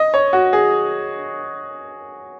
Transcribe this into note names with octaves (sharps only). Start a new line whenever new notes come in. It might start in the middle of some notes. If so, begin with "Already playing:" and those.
Already playing: D#5
C#5
F#4
G#4